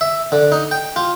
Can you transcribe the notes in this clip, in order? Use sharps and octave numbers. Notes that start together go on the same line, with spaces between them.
E5
D3
D#4
G5
F4